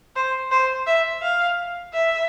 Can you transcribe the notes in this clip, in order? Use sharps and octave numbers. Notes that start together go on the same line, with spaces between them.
C5
C5
E5
F5
E5